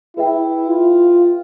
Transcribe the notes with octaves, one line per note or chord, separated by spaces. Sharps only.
E4 G#4 B4 E5 G5
F4